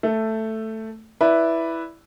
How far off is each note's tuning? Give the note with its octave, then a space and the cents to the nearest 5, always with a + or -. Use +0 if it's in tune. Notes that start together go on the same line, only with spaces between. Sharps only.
A3 +5 A4 +5
E4 +0 B4 +0 D5 +0